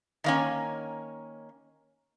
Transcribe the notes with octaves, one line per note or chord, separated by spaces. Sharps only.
D#3 A#3 C#4